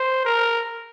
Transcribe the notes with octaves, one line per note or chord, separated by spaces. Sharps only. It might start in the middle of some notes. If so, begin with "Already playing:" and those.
Already playing: C5
A#4